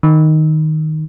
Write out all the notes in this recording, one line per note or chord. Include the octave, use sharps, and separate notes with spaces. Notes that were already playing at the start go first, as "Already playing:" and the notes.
D#3